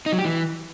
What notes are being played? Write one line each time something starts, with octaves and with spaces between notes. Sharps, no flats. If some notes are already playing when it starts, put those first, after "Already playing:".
D#4
F#3
G4
E3